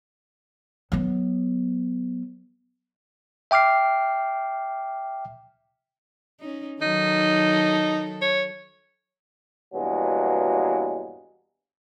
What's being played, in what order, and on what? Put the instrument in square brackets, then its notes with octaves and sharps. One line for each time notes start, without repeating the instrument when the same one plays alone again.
[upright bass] F#3 B3
[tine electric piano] E5 G5 D6 F6 C7
[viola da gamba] C#4 D#4
[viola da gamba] D#3 F#3 A4 [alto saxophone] D#4
[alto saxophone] C#5
[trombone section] E2 G2 B2 F#3 G#3 A#3